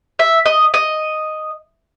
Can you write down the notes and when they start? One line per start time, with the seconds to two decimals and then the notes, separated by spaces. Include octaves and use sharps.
0.19 E5
0.46 D#5
0.74 D#5